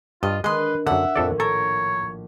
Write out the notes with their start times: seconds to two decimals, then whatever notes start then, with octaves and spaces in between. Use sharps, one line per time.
0.23 G2 F4 D#5
0.44 D#3 G#3 D4 B4 D#5 C6
0.87 F#2 D3 E5 F#5
1.16 A#1 F2 A2 A4 D5
1.40 A4 A#4 C#5